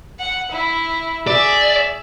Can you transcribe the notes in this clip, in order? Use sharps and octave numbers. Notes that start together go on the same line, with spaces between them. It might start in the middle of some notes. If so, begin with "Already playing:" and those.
F#5
E4
G#4 D5 E5